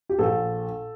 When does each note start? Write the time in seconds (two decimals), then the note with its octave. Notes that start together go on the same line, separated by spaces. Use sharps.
0.09 G4
0.19 A#1 A4